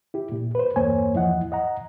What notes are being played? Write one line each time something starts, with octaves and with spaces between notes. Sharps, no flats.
E4 G4
A#2
B4 C5
E2 G2 A#3 C5 C#5 G#5
E2 F3 E4 D#5 F#5
D#5 F#5 A#5